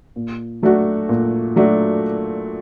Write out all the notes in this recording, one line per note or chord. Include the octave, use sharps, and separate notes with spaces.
A#2
F#3 A3 D4 F#4
A#2
F#3 A3 D4 F#4